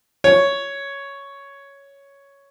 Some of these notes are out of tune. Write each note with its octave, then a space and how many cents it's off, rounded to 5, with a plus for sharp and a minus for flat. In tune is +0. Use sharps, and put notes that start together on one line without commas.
C#5 +5